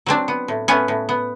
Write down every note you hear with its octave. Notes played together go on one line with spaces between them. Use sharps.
F#3 C4 D4
B3
A2
A2 B3 C#4
A2
B3